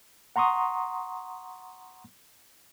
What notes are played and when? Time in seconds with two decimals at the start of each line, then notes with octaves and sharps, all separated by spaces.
0.36 F#5 A#5 C6 C#6 D#6